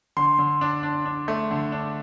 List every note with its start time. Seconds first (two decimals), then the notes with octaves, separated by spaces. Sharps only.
0.17 D3 C6
0.38 D3
0.61 D4
0.83 D4
1.05 D4
1.28 A3
1.51 D3
1.72 D4